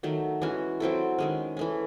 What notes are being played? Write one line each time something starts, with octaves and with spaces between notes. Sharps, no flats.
D#3 F#3 A3
E3 G#3 C#4 F#4
F#3 C4 E4 A4
D#3 G#3 C#4
E3 A3 C#4